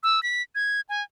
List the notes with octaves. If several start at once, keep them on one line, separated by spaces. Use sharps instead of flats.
E6
B6
G#6
G#5